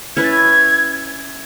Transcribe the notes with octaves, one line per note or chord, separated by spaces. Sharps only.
C#4 E4 B4 G#6
A6
G#6